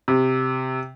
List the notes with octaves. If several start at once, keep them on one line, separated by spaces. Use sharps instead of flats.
C3